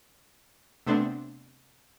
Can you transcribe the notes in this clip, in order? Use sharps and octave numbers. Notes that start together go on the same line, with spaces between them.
C3 A3 B3 C4 D4